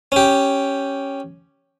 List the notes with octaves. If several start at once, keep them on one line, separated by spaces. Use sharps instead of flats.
C#4 G4